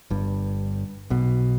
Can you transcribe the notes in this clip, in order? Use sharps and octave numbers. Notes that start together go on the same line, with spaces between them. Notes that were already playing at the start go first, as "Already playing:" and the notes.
G1 G2
B1 B2